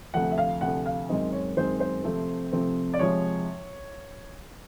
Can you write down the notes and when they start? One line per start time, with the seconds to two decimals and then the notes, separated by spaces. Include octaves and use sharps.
0.14 D2 C3 F3 A3 F#5
0.31 E5
0.38 F5
0.61 D2 C3 F3 A3 F#5
0.86 F5
1.09 F#2 D#3 G#3 C4 D#5
1.32 C#5
1.57 F#2 D#3 G#3 C4 C5
1.80 C5
2.04 C3 F3 A3 C4
2.52 C3 F3 A3 C4
2.94 D5
2.99 C3 F3 G#3 C#5